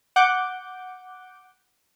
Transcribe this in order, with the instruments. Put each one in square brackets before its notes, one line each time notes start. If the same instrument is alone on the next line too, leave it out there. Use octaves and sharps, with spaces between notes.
[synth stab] F#5 D6 G6